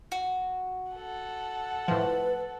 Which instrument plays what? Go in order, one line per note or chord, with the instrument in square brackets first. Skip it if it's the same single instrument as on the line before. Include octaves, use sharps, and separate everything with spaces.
[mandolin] F#4
[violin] A4 F#5
[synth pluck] A2 F3 [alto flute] B4